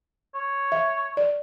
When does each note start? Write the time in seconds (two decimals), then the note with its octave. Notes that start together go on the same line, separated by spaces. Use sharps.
0.35 C#5
0.72 E5
1.17 D5